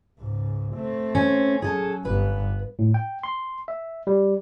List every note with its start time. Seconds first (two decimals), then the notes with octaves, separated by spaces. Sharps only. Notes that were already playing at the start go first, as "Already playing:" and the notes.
0.19 C#2 G#2
0.74 A3 C4
1.15 C#4
1.62 F#3 C#4 G#4 A4 A5
2.05 G1 B3 B4
2.79 A2
2.94 G5
3.23 C6
3.68 E5
4.07 G3